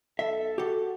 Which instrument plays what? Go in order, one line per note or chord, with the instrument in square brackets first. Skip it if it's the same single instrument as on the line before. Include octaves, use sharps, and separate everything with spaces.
[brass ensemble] B1 A4 [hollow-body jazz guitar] E5
[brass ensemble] F#4 [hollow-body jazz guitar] G4 A4